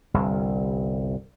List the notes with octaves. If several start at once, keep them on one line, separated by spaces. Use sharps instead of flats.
G1 C2 G2